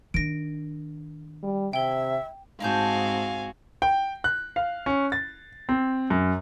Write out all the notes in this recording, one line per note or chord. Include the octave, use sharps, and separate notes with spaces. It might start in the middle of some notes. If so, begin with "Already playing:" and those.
D#3 D4 A#6 D7
G3
C3 E5 G5 G7
G#2 C4 D#4 F#4 F5 G#5 A5 G6
G5
F#6
F5
C#4
A6
C4
F#2